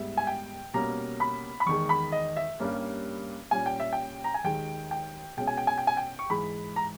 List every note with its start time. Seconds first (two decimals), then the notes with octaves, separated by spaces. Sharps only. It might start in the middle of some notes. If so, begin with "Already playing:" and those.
Already playing: G#2 G3 B3 E5
0.17 G#5
0.27 G5
0.74 B2 G3 A#3 C#4 A#5
1.20 B5
1.60 B5
1.66 E2 D#3 G#3 C#6
1.89 B5
2.12 D#5
2.37 E5
2.59 G2 G3 A#3 C#4
3.51 A#2 G3 C#4 G#5
3.66 G5
3.80 E5
3.93 G5
4.24 A#5
4.34 G#5
4.44 D#2 D#3 G#3 G5
4.91 G5
5.37 B2 G#3 C#4 G5
5.47 G#5
5.57 G5
5.67 G#5
5.78 G5
5.87 G#5
5.97 G5
6.19 C#6
6.30 G#2 E3 G#3 B5
6.76 A#5